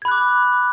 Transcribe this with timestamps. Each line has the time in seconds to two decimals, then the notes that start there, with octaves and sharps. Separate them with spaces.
0.02 G#6
0.05 B5
0.08 F#6
0.11 D6